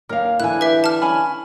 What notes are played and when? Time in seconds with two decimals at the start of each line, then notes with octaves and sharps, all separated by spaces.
0.09 D#2 C#4 A#4 F5
0.40 D3 E3 E4 G#5 F#6
0.61 G4 B4 E5
0.84 A5 F6
1.02 C#4 G#5 B5